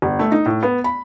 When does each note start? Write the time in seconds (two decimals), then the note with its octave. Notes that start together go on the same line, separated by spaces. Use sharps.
0.02 G1
0.19 A3
0.32 D#4
0.46 A2
0.63 B3
0.84 B5